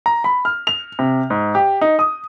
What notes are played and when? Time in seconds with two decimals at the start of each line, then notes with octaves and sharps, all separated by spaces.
0.06 A#5
0.24 B5
0.45 F6
0.67 F7
0.99 C3
1.30 G#2
1.55 G4
1.81 D#4
1.99 D#6